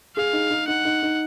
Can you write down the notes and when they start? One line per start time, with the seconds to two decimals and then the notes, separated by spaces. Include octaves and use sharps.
0.16 G#4 F5
0.33 D#4
0.50 D#4
0.68 D#4 F#5
0.85 D#4
1.03 D#4